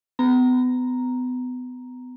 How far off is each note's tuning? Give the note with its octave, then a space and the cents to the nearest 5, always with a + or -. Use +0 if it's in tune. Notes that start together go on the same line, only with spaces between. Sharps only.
B3 +30 A#5 +0